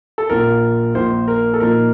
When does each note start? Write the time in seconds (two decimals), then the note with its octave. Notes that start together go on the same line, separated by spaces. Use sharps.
0.18 A4
0.30 A#1 A#2 F3 A#4
0.95 A#1 A#2 F3 C5
1.28 A#4
1.54 A4
1.60 A#2 F3 A#3 D#4 A#4